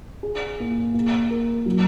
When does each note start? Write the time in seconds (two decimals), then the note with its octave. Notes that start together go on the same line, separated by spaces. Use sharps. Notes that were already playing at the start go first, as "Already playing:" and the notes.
0.23 G#4
0.60 A#3
0.94 A#3
1.31 A#4
1.66 F#3